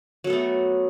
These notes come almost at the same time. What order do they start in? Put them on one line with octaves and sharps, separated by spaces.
F#3 A4 B3 A3